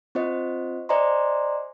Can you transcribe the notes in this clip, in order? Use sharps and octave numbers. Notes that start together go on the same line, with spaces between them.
C4 F4 C5 D#5
C5 D5 D#5 G#5 A#5 C6